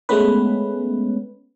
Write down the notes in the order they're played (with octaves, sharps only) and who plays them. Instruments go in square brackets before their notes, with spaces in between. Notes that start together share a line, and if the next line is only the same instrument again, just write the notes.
[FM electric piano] G#3 A3 B3 C#4 B4